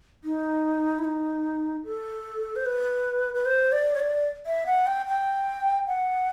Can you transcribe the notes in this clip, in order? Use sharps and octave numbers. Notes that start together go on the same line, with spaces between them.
D#4
E4
D#4
A4
C5
B4
B4
C5
D5
C#5
D5
E5
F#5
G5
G5
F#5